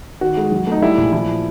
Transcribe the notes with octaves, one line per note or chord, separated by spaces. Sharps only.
D#3 F#4
G#3
F#3
A3 D#4
G3 E4
A#1
F3 E4